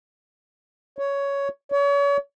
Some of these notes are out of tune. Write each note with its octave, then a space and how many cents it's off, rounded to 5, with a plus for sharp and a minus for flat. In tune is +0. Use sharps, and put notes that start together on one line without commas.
C#5 +10
C#5 +35